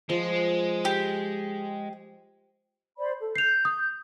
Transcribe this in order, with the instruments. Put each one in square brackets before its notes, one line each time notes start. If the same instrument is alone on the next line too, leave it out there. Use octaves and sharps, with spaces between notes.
[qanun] F3 [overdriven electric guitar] G#3
[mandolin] G4
[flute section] C5 D5 B5
A4
[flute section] G6 [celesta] C7 F7
[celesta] D#6